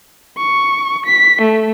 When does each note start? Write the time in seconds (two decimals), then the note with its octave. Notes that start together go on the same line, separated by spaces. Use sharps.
0.38 C#6
1.06 B6
1.41 A3